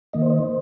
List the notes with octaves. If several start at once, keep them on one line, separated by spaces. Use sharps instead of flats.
D#3 A#3 D#5
C5
D#5
C5